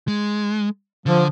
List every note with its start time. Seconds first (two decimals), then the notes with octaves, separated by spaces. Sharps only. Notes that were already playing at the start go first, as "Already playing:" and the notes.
0.08 G#3
1.06 D3 F3